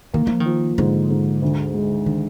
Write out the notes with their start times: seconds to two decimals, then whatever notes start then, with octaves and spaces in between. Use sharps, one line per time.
0.13 D#3 A#3
0.27 F3
0.40 D#3
0.46 F3
0.78 G#2 D3
1.10 G#2
1.42 D2
1.74 G#3
2.06 D3 D#3